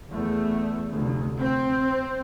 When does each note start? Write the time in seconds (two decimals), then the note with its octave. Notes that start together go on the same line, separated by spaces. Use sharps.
0.10 E2 A3
0.89 F1 D2
1.39 C4